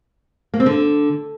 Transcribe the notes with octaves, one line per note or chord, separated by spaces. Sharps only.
A#3
C4
D3